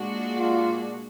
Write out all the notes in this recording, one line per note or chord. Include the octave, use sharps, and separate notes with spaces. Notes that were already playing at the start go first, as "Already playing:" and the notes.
Already playing: A#2 G#3 D4 F#4
F4